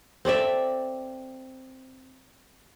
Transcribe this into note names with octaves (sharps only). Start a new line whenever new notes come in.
C4 A4 D5 E5